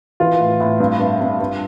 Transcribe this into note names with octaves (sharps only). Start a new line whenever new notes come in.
E3 F4
A2
A2
G2
G2
G2
G2